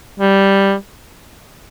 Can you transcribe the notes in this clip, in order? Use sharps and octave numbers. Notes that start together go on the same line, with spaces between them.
G3